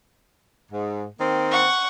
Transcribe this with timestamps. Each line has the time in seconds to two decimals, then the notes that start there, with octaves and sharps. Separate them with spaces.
0.71 G#2
1.19 D#3 A#3 C4
1.51 F#5 C#6